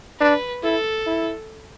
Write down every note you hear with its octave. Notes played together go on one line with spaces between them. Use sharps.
D4 B4
E4 A4
E4